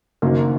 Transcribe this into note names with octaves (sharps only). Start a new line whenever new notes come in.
F#1 F#2 D#3 A#3